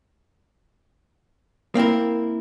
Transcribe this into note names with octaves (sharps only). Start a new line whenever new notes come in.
A#3 C4 E4 A#4